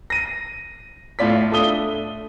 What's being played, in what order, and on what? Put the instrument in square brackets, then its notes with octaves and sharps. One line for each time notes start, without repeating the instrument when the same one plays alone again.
[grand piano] A#6 D#7
A2 F4 D5 B6
A3 D4 D#6 G7